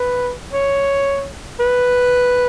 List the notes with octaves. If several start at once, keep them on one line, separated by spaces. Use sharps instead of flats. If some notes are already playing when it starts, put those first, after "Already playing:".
Already playing: B4
C#5
B4